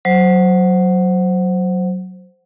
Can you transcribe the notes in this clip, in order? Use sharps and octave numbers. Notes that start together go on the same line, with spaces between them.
F#3 C5